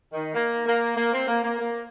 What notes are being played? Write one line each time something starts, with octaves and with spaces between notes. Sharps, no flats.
D#3
A#3
A#3
A#3
C4
A#3
A#3
A#3